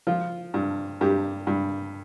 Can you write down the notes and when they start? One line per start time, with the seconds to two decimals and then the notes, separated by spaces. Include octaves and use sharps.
0.07 F3 F4
0.54 G2
1.01 G2 G4
1.47 G2